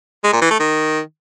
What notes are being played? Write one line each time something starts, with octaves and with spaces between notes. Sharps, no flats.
G#3
A#2
E3
A3
D#3